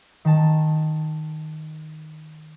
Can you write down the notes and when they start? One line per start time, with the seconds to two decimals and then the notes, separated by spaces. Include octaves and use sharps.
0.25 D#3 A5